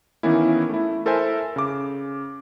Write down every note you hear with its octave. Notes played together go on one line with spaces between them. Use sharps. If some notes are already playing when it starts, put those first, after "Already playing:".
D#3 E3 A#3 B3 C#4 E4
A3 E4
E4 A4 A#4 C5 E5 G#5
C#3 D6